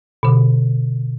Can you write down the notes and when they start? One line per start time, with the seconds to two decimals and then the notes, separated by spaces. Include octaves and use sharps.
0.23 B2 D3